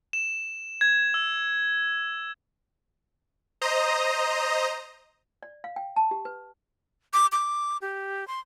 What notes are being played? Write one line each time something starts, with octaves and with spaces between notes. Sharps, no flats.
E7
G#6
E6
C5 D#5 A#5 D#6
D5
F5
G5
A5
G4
B4
D6
D6
G4
C6